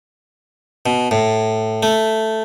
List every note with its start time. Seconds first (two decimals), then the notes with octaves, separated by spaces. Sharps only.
0.86 B2
1.11 A2
1.83 A3